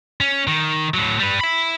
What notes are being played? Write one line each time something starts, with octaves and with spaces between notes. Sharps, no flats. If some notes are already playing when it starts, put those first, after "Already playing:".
C#4
D#3
A2 F#3
G3 B4
E5 B5